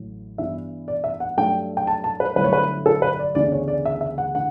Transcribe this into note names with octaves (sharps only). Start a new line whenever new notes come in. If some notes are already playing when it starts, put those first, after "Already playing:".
Already playing: A1 A2 F#3
G2 E3 B3 E4 E5
D5
E5
F#5
G2 F#3 A3 G5
G5
A5
A5
B4
G1 G2 F#3 A3 E4 B4
C#5
B4
A4
B4
D5
D2 C#3 E3 B3 D4 D5
C#5
D5
E5
E5
F#5
D3 F#5